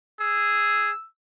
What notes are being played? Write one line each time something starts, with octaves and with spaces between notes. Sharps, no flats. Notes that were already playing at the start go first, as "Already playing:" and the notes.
G#4 E6